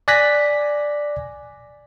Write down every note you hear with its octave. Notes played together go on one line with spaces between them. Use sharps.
D5 G#5 F#6 A#6 B6